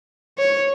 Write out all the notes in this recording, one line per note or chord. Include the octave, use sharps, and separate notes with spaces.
C#5